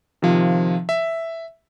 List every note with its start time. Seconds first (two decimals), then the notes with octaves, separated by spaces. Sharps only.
0.22 C3 D#3 F3 F4
0.89 E5